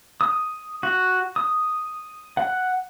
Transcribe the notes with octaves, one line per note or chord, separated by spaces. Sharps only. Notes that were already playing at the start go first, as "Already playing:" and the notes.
D#6
F#4
D#6
F#5